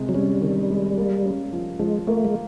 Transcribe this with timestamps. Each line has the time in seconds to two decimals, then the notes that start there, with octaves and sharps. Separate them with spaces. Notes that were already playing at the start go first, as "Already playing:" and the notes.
Already playing: C3 G#3
0.09 F#3
0.14 G3 C#4
0.41 D#3
0.70 G#3
0.97 A#3
1.25 C#4
1.53 F3
1.79 F3 G#3
2.07 A3 A#3
2.25 G#3